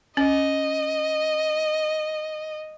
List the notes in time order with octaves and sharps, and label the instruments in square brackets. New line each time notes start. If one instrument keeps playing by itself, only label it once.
[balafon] C#4 [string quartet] D#5